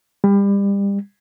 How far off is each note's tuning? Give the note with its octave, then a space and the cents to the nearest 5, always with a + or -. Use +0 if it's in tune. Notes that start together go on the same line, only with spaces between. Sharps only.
G3 +30